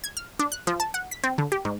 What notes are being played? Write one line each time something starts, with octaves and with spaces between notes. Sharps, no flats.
G#6
F6
D4
F#6
F3
A5
F#5
B6
C4
D3
G4
G#2